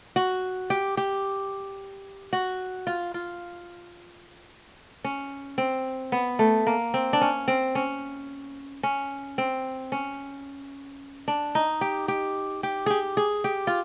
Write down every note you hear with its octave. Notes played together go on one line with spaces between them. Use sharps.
F#4
G4
G4
F#4
F4
F4
C#4
C4
B3
A3
A#3
C4
D4
C#4
C4
C#4
C#4
C4
C#4
D4
D#4
G4
G4
G4
G4 G#4
G#4
G4
F4